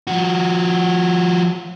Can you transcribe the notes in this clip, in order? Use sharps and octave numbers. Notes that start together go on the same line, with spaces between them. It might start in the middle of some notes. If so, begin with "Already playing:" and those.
F3 F#4